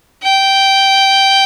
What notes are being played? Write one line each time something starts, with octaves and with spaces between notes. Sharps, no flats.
G5